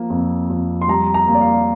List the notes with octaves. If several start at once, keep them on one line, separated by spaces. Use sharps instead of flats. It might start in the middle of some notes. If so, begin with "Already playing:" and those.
Already playing: F3 A#3
F2
F2
C6
G3 A#5
A#5
A#3
D5
F5